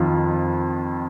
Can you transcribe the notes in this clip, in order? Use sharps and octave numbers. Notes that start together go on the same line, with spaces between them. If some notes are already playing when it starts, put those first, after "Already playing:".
Already playing: F2 D#3 F4